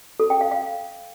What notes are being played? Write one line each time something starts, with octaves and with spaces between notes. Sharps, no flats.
A4
G5
F5
F5